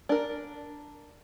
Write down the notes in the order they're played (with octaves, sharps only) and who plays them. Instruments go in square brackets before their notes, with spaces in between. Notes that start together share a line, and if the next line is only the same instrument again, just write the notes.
[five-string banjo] D4 A#4